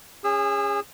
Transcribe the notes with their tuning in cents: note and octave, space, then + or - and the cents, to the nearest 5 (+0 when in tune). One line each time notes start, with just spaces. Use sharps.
C#4 +0 G#4 -30 E6 +0